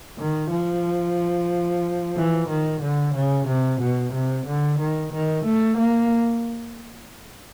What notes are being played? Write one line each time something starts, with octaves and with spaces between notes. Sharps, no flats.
D#3
F3
E3
D#3
D3
C#3
C3
B2
C3
D3
D#3
D#3
A3
A#3